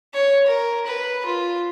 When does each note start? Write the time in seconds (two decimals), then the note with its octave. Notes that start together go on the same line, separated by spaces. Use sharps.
0.14 C#5
0.46 A#4
0.86 B4
1.25 F4